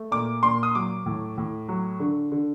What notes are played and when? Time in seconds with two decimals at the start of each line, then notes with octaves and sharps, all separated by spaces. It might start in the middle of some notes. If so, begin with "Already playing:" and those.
Already playing: A3
0.11 A#2 D6
0.43 A#2 C6
0.63 D#6
0.75 F#3 D6
1.06 A2
1.38 A2
1.68 F#3
2.00 D3
2.32 D3